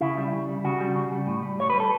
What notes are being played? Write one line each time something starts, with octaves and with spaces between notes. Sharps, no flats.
C#3 E4
G3
C#3
G3
C#3 F#4
G3
C#3
G3
A2
G3
A2 C#5
G3 B4
A4